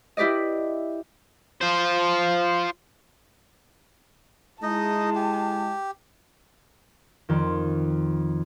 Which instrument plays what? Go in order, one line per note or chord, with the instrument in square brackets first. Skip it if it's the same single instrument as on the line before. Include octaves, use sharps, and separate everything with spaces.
[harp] E4 G4 B4 D5 D#5
[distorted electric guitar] F4 C5
[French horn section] G#3 E4 [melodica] D#4 D#5 [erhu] A5
[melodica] G4
[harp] F2 D#3